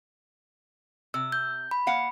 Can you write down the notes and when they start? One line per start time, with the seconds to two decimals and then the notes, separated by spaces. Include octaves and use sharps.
1.14 C3 E6
1.32 G6
1.71 B5
1.87 A#3 F5 F#5